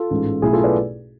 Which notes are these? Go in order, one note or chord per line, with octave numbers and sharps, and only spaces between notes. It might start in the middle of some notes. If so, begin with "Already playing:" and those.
Already playing: F4 A4
A1 G#2 G#3
B1 B2 A3 E4 G#4
F4 A4
B4 D5